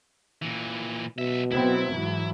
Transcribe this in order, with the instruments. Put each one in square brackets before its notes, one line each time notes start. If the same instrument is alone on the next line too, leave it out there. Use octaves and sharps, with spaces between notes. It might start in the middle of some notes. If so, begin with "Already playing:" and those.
[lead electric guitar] A#2 E3
[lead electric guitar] B1 E5 [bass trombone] B2
[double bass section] F#3 B3 C4 [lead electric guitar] E4
[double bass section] G#2 E3 F#3